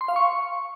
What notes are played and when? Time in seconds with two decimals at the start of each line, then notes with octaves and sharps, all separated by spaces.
0.01 C6
0.08 F5
0.16 C#6